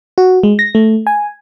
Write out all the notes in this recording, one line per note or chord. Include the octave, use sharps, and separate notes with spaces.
F#4
G#3
A#6
A3
G#5